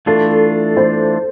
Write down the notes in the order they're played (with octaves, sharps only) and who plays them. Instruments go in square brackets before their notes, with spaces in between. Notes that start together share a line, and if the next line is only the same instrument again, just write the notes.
[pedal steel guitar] E3 A3 D4 F4 [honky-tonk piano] A4
[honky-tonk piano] C5